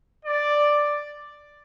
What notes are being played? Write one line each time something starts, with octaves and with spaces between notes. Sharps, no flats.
D5